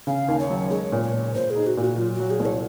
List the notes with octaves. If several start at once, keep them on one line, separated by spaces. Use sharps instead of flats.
C#3 F5
D#2
C#5
F#3
G#3 C#5
A#2
C#5
A#2
A#2 C5
G#4
D#4
F#4
A#2 F#4
F#3 F4
F#4
F#3
G#4
C2
C#5